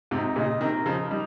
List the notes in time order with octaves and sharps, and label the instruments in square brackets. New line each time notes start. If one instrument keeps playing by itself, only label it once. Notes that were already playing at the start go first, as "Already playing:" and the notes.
[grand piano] G#2 C3 [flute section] D#4
[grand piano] A#2 C#3 [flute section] D#5
[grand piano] C3 D#3 [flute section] A#4
[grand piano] C#3 F3 [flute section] D#4
[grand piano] G3 [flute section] D#4